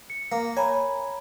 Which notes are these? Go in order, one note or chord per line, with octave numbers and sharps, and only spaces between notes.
C#7
A#3
C#5 G#5 A#5 B5